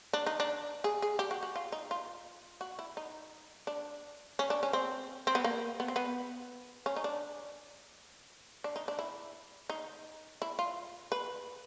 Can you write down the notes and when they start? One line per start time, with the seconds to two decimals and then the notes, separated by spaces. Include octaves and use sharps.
0.13 D4
0.26 D#4
0.40 D4
0.84 G#4
1.02 G#4
1.19 G4
1.31 F#4
1.43 F#4
1.56 F4
1.72 D#4
1.91 F4
2.61 F#4
2.79 E4
2.97 D#4
3.67 D4
4.39 C#4
4.50 D4
4.63 C#4
4.73 C4
5.27 C4
5.35 B3
5.44 A#3
5.80 B3
5.88 C4
5.96 B3
6.86 C#4
6.96 D#4
7.04 D4
8.64 D4
8.76 D#4
8.88 D4
8.99 E4
9.69 D#4
10.42 E4
10.59 F4
11.12 B4